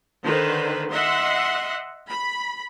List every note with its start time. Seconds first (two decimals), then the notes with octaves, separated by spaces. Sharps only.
0.23 D3 D#3 B4 C5
0.90 D#5 E5 F#5 C6
2.08 B5